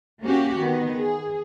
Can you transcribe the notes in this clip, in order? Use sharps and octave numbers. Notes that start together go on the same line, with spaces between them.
A#3 C#4 F#4 G4
D#3 B3
G#4